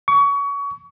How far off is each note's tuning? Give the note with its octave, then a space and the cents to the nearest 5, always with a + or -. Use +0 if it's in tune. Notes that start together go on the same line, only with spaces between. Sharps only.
C#6 +30